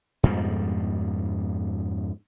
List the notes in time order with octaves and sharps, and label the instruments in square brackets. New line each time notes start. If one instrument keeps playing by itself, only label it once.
[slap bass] F2 G#2 B2 G3